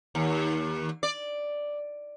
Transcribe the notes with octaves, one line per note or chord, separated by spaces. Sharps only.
D#2
D5